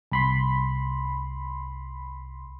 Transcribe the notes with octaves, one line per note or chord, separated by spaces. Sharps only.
C2 B5 C6